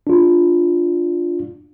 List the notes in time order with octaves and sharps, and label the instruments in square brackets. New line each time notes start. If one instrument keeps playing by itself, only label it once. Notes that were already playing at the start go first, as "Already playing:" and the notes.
[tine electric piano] D4 F4